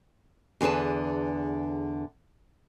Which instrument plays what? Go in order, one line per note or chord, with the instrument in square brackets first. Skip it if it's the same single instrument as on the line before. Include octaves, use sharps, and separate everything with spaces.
[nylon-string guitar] E2 D3 G#4 B4 A5